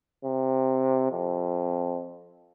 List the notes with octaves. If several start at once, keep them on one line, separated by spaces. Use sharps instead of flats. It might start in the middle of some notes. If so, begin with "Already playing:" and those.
C3
F2